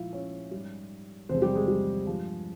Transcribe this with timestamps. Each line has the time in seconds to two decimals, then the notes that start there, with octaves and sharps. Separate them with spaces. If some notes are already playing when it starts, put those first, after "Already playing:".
Already playing: A#2 F3 G#3 E4 F4 E5 F5
0.13 C#4 C#5
0.51 G#2 G3
1.29 E2 C3 F3 G#3 C4 C5
1.42 G3 G4
1.55 G#3 G#4
1.68 G3 G4
2.07 G2 F3 G#3 F4